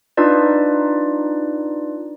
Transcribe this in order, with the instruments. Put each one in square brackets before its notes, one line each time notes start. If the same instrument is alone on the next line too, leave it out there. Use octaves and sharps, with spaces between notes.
[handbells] D4 D#4 F4 B4 D5